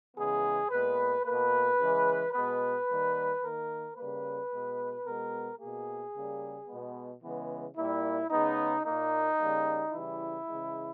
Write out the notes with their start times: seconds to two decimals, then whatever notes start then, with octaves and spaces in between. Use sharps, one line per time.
0.16 C#3 E3 G#3 B3 G#4
0.70 A#2 G#3 B3 B4
1.25 B2 A#3 B4
1.79 C#3 E3 G#3
2.33 B2 G#3 B3 B4
2.88 D#3 G3 A#3
3.42 D#3 A#3 A#4
3.96 C#3 G3 A#3 B4
4.51 B2 G#3 B3
5.05 B2 G#3 B3 A#4
5.59 B2 A#3 G#4
6.14 C#3 G3 A#3
6.68 B2 G#3 B3
7.22 C#3 E3 G#3 B3
7.76 A#2 G3 A#3 E4
8.30 C#3 G#3 B3 D#4
8.84 A#2 A#3 D#4
9.39 C#3 G3 A#3
9.93 C#3 E3 G3 E4
10.47 C#3 E3 G#3